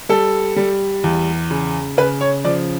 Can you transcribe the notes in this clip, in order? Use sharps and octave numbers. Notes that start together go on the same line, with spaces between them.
G3 A4
G3
E2
C#3
C#3 B4
C#5
F3 D5